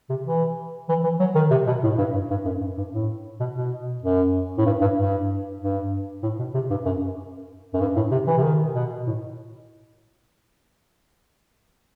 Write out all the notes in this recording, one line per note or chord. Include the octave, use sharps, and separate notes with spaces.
C3
E3
E3
E3
F#3
D#3
C3
B2
A2
G2
G2
G2
F#2
G2
G2
A2
B2
B2
F#2
A2
G2
G2
G2
G2
A2
B2
C3
G2
F#2
F#2
G2
A2
C3
E3
C3
D#3
B2
A2